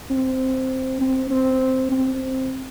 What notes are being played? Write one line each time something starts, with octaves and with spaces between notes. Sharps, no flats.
C4
C4
C4
C4